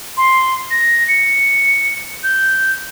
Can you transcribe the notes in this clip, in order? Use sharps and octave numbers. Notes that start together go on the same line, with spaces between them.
C6
A#6
C#7
G6